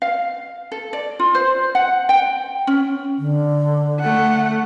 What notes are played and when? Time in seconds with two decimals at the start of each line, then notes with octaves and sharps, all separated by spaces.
0.02 F5
0.72 A4
0.93 D5
1.19 F4
1.35 C5
1.75 F#5
2.09 G5
2.67 C#4
3.18 D3
4.00 A3 F#5